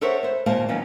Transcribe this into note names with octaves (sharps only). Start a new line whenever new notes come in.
A4 A#4 C5 C#5 E5 F#5
B3 C5
D#2 A#2 A#3 C5 F5 A5
D#3 F3 F#3 B3 C#4